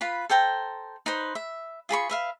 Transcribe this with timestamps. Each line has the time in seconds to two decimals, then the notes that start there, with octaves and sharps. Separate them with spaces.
0.01 F4 B4 B5
0.30 A4 C5 G5 A#5
1.06 D#4 B4 C5
1.35 E5
1.89 F4 G#4 B5 C#6
2.09 B4 E5 F5